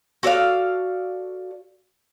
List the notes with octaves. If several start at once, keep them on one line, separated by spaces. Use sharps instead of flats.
F#4 A4 D5 F5